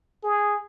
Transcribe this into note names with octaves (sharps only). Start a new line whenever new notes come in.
G#4